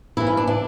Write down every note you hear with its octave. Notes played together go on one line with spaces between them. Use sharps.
G2 E3 E4
C#4
D4
E3 D4